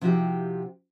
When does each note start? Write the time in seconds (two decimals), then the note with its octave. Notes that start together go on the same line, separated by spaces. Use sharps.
0.01 C3 F3 E4 F#4 G4 G5